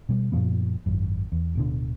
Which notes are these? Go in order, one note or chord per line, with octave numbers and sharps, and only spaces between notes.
B2 G3
F#2 A#2 F3 B3
G#1 F#2
E2
D1 B2 D3